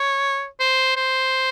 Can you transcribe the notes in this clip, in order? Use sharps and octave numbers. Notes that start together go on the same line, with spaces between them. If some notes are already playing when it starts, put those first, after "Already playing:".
Already playing: C#5
C5
C5